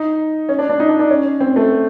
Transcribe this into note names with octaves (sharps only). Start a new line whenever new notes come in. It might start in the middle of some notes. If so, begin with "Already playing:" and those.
Already playing: D#4
C#4
D4
D4
D#4
D4
D4
C#4
C4
A3